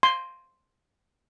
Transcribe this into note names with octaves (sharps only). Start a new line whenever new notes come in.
C6